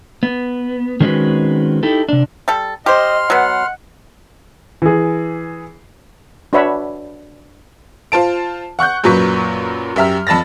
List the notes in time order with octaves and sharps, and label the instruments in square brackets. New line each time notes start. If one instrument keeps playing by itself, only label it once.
[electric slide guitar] B3
D#3 G#3 C4 C#4 F#4 B4
D#4 E4 G4 A4
C3 D4
[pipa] G3 A4
[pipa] G4 C5 [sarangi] D#5 [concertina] C6 F6
[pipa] F#3 B3 [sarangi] F#5
[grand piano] E3 G#4
[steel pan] D4 F#4 B4 C#5 E5 B5
[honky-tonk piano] F4 C5 A5 D7
F#5 C#6 F#6 G6
F#2 A#2 F#3 B4 C#6 B6
F#2 G4 E5 A#5 F6
F2 A5 B5 A6 A#6